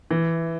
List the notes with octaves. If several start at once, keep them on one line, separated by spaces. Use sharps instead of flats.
E3